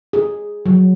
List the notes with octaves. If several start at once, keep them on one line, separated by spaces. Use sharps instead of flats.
G#4
F#3